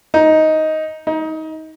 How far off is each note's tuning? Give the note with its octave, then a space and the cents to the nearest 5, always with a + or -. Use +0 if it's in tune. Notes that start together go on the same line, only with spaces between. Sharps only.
D#4 +10
D#4 +25